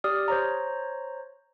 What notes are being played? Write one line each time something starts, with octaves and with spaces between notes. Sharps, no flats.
G4 D5 D#6 F6
C5 C#5 A#5